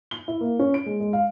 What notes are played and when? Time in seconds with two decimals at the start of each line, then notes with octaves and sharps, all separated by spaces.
0.11 G7
0.28 E4
0.41 A#3
0.59 C#4
0.74 D7
0.86 G#3
1.00 G#3
1.13 F5